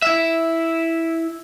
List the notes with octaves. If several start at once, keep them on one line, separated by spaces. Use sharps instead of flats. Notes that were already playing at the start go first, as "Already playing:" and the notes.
E4 E5